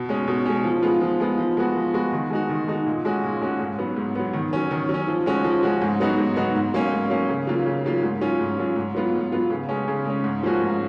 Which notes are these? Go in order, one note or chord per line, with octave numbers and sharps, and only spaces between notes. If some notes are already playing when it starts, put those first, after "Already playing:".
Already playing: B2
G#3 C#4
B2
G#3 C#4
F3
G#3 B3 F4
F3
G#3 B3 F4
F3
G#3 B3 F#4
F3
G#3 B3 F#4
D#3
G#3 D#4 F#4
D#3
G#3 D#4 F#4
A#2
G#3 C#4 F#4
A#2
G#3 C#4 F#4
G#2
F#3 B3
G#2
F#3 B3
D#3
F#3 C#4
D#3
F#3
C#4
F3
G#3 C#4 F#4
F3
G#3 C#4 F#4
G#2
F#3 B3 D#4 F#4
G#2
F#3 B3 D#4 F#4
G#2
F#3 A#3 C#4
G#2
F#3 A#3 C#4
C#3
F#3 A#3 F4
C#3
F#3 A#3 F4
G#2
F#3 C#4 F4
G#2
F#3 C#4 F4
G#2
F#3 B3 F4
G#2
F#3 B3 F4
C#3
G#3 C#4
C#3
G#3 C#4
G#2
F3 A#3 C#4 F#4
G#2